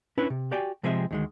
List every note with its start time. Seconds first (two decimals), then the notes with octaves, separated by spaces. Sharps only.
0.18 C#4 D4 E4 B4 E5
0.30 C3
0.51 F#4 G4 D5 G5 G#5
0.83 C3 F3 G#3 C4 G#4 E5
1.11 D2 D#3 G#3